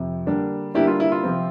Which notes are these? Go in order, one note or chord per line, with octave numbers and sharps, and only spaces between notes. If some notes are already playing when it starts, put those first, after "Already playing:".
Already playing: F2 C3
D3 G3 A#3 D4
D3 G3 A#3 D4 E4 G4
F4
E4
F4
C3 F3 C4